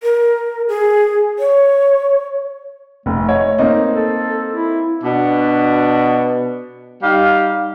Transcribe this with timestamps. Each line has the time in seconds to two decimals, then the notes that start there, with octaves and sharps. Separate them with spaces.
0.03 A#4
0.68 G#4
1.39 C#5
3.06 F1 A3
3.29 C#5 D#5
3.58 A#3 C4 D#4
3.94 A4
4.53 E4
5.04 B2 D4
7.02 G3 D#4 G4 F5